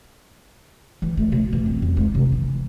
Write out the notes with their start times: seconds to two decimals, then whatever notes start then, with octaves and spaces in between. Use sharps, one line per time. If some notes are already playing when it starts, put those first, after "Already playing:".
1.02 E3
1.17 A3
1.32 B2
1.53 E3
1.66 C4
1.82 F2
1.97 G#3
2.15 C3
2.32 E3